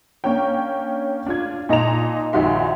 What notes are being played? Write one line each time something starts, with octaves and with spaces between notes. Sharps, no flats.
A#3 C#4 D4 C#5 G5
D4 F4 G#6
A#2 D#4 D#5 A5 A#5 F7
A#1 D#3 F#4 G4 E5 C6